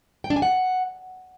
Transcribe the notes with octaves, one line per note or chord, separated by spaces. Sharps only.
G5
D4
G#5
F#5